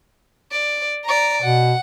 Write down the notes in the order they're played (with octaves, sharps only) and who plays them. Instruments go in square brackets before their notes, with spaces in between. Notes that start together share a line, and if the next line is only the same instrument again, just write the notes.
[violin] D5
D5 A#5
[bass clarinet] B2 [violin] F#5